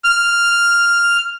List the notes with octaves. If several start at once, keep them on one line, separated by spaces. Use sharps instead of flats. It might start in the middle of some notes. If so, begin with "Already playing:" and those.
F6